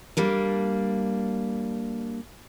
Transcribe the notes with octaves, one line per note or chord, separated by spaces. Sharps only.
G3 A#3 D4